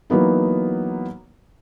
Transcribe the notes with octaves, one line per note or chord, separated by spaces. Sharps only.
E3 F#3 A#3 B3 D#4